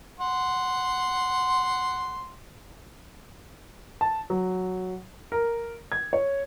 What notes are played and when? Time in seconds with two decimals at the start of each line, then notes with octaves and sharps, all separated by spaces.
0.20 F#5 C6
4.01 A5
4.30 F#3
5.32 A#4
5.92 G#6
6.13 C#5